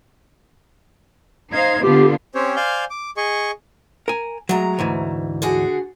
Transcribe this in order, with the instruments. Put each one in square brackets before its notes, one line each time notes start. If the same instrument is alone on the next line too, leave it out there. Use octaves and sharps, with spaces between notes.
[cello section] D#4 C5 F5 [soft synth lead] G#6
[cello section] D3 B3 F4 [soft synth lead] G4
[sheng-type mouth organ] C4 C#4 G4 C5 C#5
C5 D5 F5 G#5 F6 G6
D6
G#4 D#5 C#6
[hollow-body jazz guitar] A#4 G#5
[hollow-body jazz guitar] F#3 G#3 [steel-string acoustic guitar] A3 A#5
[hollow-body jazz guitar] D2 G#2 E3
[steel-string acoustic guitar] D3 F#4 G#4